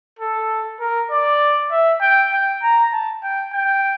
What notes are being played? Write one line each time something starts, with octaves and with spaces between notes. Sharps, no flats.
A4
A#4
D5
E5
G5
G5
A#5
A5
G5
G5